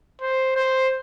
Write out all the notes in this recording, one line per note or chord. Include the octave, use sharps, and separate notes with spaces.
C5
C5